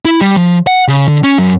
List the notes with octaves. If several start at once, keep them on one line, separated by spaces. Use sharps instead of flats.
E4
G3
F3
F#5
C#3
D3
C#4
F#2